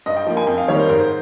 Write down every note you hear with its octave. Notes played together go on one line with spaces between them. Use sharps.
G2 D#5
G5
F3 A#3
G#5
F2 G5
F5
D#3 G3 A#3 C#5
C5
G#2 A#4
C5